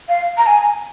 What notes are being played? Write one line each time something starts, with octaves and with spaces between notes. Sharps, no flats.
F5
A#5
G#5